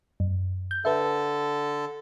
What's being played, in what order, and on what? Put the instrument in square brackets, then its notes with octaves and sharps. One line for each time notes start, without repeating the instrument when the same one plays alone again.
[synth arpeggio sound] F#2
G6
[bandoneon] D3 A4 [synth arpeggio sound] B4 E5